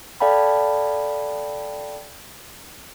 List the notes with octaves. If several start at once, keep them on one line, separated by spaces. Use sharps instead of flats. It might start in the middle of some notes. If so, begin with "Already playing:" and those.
A4 D5 F5 G5 A5 B5